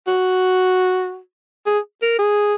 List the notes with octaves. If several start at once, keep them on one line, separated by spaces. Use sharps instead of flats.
F#4
G#4
A#4
G#4